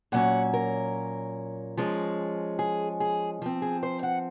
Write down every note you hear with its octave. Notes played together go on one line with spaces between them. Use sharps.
A#2 F#3 C#4 F#5
A#4
F3 G#3 C#4
G#4
G#4
F3 C4
G#4
C5
F#5